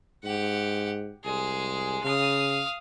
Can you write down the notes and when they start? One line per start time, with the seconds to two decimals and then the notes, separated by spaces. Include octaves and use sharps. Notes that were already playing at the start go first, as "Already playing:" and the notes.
0.24 G#2 G4 F#5
1.25 C2 G#3 G#4
2.04 C#3 F5 D#6